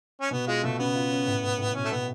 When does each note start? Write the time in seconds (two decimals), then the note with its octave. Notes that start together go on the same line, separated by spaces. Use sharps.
0.21 C#4
0.31 B2 B3
0.47 G#3 F4
0.63 B2 A3
0.79 C#3 B3
0.96 F4
1.12 C#4
1.27 A2
1.43 A2
1.59 A2
1.74 B2 C#4
1.85 A3
1.91 B2 B3